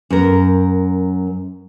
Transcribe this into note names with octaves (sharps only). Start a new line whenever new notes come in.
F#2 A#4